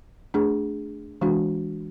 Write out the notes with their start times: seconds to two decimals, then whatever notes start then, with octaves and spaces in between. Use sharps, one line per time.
0.34 A3 D4 G#4
1.21 E3 G#3 D4 F#4